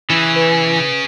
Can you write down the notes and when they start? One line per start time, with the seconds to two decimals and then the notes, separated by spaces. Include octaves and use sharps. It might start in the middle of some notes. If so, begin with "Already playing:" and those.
0.10 E3 C#4 G#4
0.36 B4